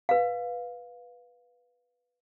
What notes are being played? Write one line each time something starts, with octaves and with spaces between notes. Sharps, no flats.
B4 F5